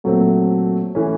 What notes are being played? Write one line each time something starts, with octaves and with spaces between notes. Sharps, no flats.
A#2 F#3 A3 C4
E3 A3 C#4